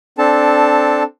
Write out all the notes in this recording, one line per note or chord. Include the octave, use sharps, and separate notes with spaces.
C4 D4 A4 A5